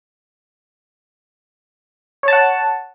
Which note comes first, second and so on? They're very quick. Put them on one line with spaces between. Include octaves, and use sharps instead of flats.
C#5 A5 F#5